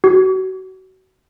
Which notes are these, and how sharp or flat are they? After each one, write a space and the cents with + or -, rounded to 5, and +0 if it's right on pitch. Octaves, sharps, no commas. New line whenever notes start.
F#4 +30